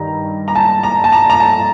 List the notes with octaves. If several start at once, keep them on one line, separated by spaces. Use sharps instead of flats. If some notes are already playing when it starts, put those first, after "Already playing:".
Already playing: G2 D#3 G3 A#5
A#5
A5
A#5
A5
A#5
A#5
A5